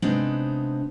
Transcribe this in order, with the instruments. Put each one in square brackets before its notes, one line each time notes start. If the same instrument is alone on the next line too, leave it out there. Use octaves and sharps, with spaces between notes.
[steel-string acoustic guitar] C3 G#3 B3 C4 D4 D#4